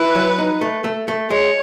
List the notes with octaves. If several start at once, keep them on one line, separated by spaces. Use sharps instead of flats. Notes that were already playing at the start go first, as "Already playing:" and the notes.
Already playing: E4 B4
F#3
D#4
A3
A3
A3
G#3 C#5